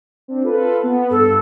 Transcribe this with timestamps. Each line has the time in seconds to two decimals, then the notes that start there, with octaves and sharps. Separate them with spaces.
0.28 C4 D4
0.43 F4 A4 B4
0.83 B3
1.10 G2 A4